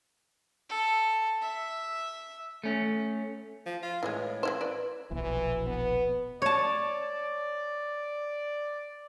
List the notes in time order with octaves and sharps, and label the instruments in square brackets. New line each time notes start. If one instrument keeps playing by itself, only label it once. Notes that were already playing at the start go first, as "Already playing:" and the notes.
[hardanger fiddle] A4
E5
[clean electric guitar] A3 C#4
[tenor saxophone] F3
F4
[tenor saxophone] A2 [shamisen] E3 G3 G#3
[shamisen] E3 E4 C5
B4 D5
[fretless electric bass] D#1 A#1 B2 [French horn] E3
[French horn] B3
[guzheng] C#5 A5 [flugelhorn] D5